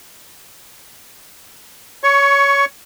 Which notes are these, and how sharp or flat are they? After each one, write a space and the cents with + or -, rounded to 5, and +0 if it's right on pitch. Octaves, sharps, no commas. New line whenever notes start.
C#5 +20 C#6 +0